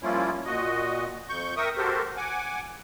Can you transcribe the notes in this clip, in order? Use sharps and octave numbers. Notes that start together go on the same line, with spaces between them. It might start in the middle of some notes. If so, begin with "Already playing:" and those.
F3 G3 A#3 C#4 E4 F4
A#2 F#4 D#5
F2 C#6 G6
A#4 E5 G5 C#6 D#6
F#4 G4 A4 A#4 C5
F#5 G#5 D6